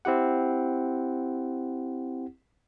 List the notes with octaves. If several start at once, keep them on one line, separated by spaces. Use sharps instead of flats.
C4 E4 G4 F#5